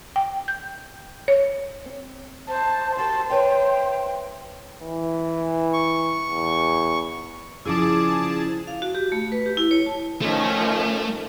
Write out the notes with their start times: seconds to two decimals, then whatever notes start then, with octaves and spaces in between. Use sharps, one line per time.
0.16 G5
0.48 G6
1.28 C#5
1.86 C4
2.49 C5 A5
2.97 F#4 G4 A#4 C5 A5
3.30 B4 C#5 E5 G5
4.84 E3
5.73 C#6
6.30 E2
7.65 C#3 F3 E4 G#4 D5 A5 D6
8.67 F5
8.82 F#4
8.95 G4
9.12 A3
9.32 B4
9.46 G4
9.57 E4
9.71 C#5
9.86 A5
10.21 D#3 F3 A3 C#4